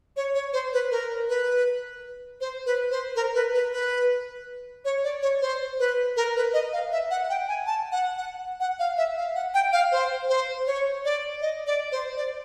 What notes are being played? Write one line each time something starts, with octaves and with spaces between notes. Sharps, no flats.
C#5
C#5
C5
B4
A#4
B4
C5
B4
C5
A#4
B4
B4
B4
C#5
D5
C#5
C5
B4
A#4
B4
D#5
F5
E5
F#5
G5
G#5
A5
F#5
F#5
F#5
F5
E5
F5
F#5
G5
F5
C5
C5
C#5
D5
D#5
D5
C5
D5